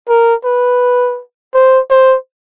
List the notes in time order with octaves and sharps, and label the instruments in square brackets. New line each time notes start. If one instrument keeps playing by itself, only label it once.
[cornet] A#4
B4
C5
C5